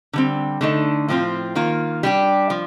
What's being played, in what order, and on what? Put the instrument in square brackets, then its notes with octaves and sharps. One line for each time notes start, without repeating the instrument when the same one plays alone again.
[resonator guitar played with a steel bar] D3 G3 C4
D3 A3 D#4 A4
A2 F3 C4 F4
D#3 A#3 F4
G3 D4 G4
F3